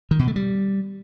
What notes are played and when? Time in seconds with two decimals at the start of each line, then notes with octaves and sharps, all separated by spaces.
0.11 D#3
0.19 B2
0.28 A3
0.36 G3